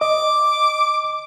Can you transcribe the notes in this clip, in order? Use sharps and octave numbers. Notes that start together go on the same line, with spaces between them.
D#5 D6